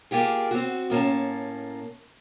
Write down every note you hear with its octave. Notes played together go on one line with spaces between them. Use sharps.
A#3 F4 G4 G#4
C4 F#4
A2 A#3 C#4 A5